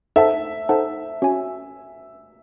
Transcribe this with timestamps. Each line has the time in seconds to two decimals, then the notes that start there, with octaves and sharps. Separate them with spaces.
0.16 D#4 A4 C5 E5 F#5 A5
0.69 D#4 A4 C5 F#5 A5
1.22 C#4 F#4 C#5 G#5